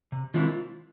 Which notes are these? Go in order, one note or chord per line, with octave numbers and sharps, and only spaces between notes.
C3
D#3 G#3 C4 E4 F4